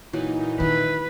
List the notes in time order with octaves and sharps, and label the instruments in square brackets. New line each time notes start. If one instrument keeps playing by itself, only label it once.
[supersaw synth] A#2 D#4 [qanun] E3 F#3
[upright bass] D#3 [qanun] E4 [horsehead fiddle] B4